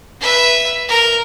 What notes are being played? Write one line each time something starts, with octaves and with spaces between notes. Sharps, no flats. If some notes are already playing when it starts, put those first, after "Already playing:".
B4 E5
A#4